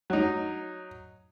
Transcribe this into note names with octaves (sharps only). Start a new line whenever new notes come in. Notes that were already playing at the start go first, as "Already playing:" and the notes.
F#3 D#4